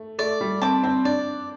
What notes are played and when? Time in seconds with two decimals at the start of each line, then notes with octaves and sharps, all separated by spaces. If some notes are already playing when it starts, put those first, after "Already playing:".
Already playing: A3
0.19 A3 D5
0.41 G3
0.62 C4 A5 D6
0.84 C4
1.05 D4 D5